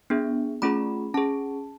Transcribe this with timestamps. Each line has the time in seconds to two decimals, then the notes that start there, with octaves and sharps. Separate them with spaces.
0.10 B3 D4 G#4
0.62 A3 C#4 F4 G#4 B5
1.14 C#4 G#4 A5